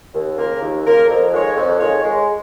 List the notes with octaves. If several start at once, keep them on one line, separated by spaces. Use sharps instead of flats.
D#2
C#3 A#3 F4 A#4
D#2
C#3 A#3 F4 A#4
F2
D#3 G#3 F4 C#5
F2
D#3 G#3 F4 C#5
G#3